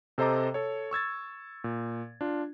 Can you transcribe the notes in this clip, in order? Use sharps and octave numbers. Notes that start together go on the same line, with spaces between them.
C3 A4 C5 D#5 A#5 D6
A4 C#5
C#6 E6 G#6 A6
A#2
D4 F4